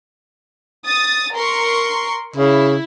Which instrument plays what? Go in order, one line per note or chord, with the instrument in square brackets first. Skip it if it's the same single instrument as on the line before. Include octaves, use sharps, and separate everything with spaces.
[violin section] D#6 A6
A#4 C6 C#6
[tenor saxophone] C#3 [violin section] E4